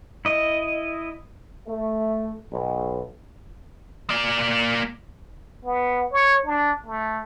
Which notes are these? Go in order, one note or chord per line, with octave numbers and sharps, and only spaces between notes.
E4 D#5
A3
B1
A#3 D5
B3
C#5
D4
A3